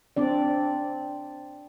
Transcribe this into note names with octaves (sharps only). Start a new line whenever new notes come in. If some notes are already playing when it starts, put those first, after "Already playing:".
C4 D4 D5